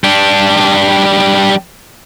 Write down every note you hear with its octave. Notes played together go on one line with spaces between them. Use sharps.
G3 D4